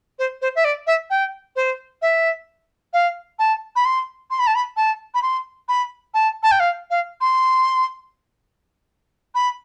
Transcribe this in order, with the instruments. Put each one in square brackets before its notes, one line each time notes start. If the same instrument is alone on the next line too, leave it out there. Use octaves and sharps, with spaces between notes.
[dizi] C5
C5
E5
D5
E5
G5
C5
E5
F5
A5
B5
C6
C6
B5
A5
B5
A5
B5
C6
B5
A5
A5
G5
F5
F5
C6
B5